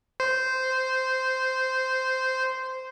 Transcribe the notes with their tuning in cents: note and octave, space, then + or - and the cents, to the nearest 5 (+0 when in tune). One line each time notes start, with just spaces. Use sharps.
C5 -10